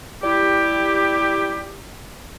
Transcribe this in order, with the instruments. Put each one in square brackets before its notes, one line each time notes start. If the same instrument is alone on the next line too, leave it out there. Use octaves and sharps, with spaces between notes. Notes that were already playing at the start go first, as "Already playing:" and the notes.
[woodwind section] G3 E4 G4